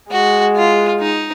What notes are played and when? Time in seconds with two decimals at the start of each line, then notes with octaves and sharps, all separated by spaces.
0.12 G#3 F#4
0.57 F4
1.01 D#4